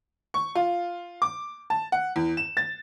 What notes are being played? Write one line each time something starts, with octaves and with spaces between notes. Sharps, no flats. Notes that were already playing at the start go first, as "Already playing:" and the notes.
C#6
F4
D6
A5
F#5
E2
E7
A6